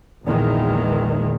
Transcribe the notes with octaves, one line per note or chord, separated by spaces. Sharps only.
A#1 E2 A#2 D#3 E3 G#3